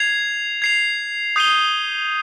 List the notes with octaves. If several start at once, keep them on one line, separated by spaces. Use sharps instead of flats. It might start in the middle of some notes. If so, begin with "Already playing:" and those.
Already playing: G#6 C7 F7
G#6 C7 F7
D#6 G6 C7 D#7 G7